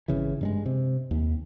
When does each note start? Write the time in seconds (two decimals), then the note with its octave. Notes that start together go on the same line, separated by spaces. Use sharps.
0.08 G#1 C#3 E3
0.41 G2 G3 G#3
0.66 C3
1.11 D#2